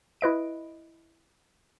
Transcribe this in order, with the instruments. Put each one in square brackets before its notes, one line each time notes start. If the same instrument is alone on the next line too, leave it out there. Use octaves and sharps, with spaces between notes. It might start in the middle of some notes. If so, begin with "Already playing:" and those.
[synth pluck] E4 B4 D#5 D7